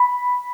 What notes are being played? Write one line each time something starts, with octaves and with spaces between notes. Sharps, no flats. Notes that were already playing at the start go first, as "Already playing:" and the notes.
Already playing: B5